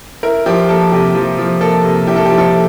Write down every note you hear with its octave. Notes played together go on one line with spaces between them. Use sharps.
E4 A#4
F3 G4
A#3 A4
C3 G4
F3
F3
A#3 A4
C3
E4 G4
A4
G4
F3
A4